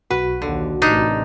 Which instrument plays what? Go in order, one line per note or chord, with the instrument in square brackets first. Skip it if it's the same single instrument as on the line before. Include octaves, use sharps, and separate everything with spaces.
[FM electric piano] B1 F#4 [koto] B4
[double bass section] D#2 [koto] D3
[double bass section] A1 C3 [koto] D4 D#4 A#4